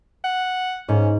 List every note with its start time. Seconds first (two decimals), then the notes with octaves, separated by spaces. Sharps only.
0.24 F#5
0.89 G#2 C#4